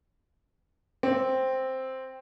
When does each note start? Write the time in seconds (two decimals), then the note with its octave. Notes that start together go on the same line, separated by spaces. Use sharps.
1.03 C4